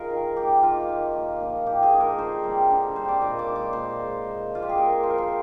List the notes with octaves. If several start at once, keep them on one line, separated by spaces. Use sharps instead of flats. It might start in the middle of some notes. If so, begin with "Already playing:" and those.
Already playing: D#4 F4 G#4 A#4
D#3
A#3 D#4 G4
D#3 F4
A#3 D#4
A#2
F3 A#3 D#4
A#2 G4
G#4
F3 A#3 D#4
A#4
D3 C5
G3 C4
D3
G3 C4 C5
D5
A#2 D#5
D5
G#3 D#4
D5
A#2 C5
G#3 D#4
A#2
F3 A#3 F4
G4
G#4
A#2 A#4
F3 A#3 C5
A#4
C5